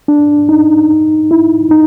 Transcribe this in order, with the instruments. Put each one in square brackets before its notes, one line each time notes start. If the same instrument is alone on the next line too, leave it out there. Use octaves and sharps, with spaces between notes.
[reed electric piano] D4
D#4
E4
D#4